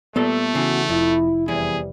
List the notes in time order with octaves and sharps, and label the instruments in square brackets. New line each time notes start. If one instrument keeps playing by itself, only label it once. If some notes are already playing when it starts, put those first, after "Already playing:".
[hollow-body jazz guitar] A#2 G3 A4 [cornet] A3 [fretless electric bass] B3
[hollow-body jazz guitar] C#3 E3 [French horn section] F#4
[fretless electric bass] F1 [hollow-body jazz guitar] F2 [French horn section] E4
[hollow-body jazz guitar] E2 E4 [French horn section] C3 E3 G3 [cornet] G#4